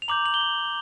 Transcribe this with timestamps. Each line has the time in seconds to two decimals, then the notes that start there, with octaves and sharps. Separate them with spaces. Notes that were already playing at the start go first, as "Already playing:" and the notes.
0.02 F7
0.08 A#5 D6 G6 F#7
0.26 F#7
0.34 G7
0.41 F#7